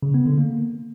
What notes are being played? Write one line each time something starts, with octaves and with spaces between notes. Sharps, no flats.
C#3
B3
D3
A#3